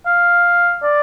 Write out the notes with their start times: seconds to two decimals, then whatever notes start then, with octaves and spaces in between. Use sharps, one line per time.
0.06 F5
0.83 D5